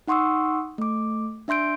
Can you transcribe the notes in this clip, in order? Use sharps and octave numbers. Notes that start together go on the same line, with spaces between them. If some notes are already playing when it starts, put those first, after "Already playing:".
D#4 F#5 C6 C#6 D#6 E6
A3 D6
D4 E5 C6 G6 D7